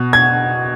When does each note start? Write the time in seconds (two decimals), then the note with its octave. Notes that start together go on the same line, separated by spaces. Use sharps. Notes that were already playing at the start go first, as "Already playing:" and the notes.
Already playing: B2
0.13 G#6